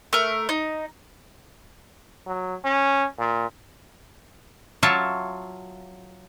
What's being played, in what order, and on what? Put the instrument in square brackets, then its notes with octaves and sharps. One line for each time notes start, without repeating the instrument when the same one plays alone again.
[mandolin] A3 A#4
D#4
[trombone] F#3
C#4
A#2
[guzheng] F#3 F4 C#5 E5 A5